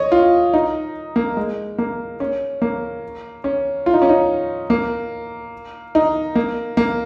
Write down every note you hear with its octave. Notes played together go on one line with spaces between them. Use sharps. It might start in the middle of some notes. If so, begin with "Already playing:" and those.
Already playing: C#5 D#5
F4
D#4
A#3
G#3
A#3
C#4
A#3
C#4
F4
D#4
C#4
D#4
A#3
D#4
A#3
A#3